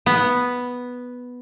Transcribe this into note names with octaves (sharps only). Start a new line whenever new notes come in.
B3